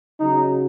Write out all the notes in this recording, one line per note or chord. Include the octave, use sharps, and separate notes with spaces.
C#3 F#3 D#4